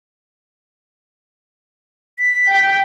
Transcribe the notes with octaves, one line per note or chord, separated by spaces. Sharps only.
B6
G5